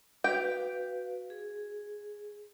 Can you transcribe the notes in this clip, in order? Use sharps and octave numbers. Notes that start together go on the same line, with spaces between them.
F#4 B4 F5 G5
G#4